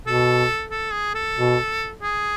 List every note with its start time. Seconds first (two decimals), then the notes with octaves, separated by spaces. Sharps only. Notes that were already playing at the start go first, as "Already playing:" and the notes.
0.06 B2 A4
0.71 A4
0.93 G#4
1.15 A4
1.37 B2
2.02 G#4